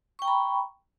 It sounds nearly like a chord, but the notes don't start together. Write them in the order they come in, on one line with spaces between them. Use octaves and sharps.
C#6 G5 A#5 B5